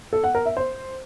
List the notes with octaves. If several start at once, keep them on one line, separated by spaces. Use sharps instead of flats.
A4
F#5
A#4
E5
C5